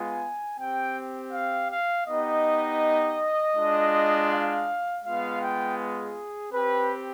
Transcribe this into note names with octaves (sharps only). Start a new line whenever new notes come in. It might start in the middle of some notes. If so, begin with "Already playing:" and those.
Already playing: G#3 B3 F4 G#5
C4 G4 G5
F5
F5
B3 D#4 G4 D#5
G#3 D4 F4
F5
G#3 B3 F4 F5
G5
G#4
C4 G4 B4